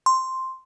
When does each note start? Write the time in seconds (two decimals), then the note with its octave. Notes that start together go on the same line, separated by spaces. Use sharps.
0.06 C6